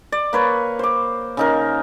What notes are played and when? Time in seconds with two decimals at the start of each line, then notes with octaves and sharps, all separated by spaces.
0.12 D5
0.33 A#3 B4 C#5
0.79 C5 D6
1.37 C#3 D#4 A#4